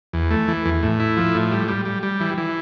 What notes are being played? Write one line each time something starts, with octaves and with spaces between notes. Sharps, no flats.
E2
A3
E3
E2
A2
E4
F3
A2
G3
G3
G3
G3
E3
E3